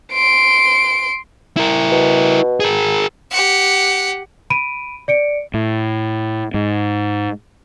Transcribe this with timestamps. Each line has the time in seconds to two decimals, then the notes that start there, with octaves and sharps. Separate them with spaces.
0.13 C6 D7
1.57 E4 A#4
1.91 B2
2.60 G#4 A#4
3.31 G4 F#5
4.50 B5 D7 D#7
5.08 D5 C#7 D7
5.54 A2
6.54 G#2